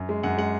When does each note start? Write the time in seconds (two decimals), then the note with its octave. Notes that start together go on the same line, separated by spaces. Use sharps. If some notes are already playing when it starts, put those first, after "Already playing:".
Already playing: F#2
0.09 G#3
0.23 F#2 F#5
0.38 G#3 F#5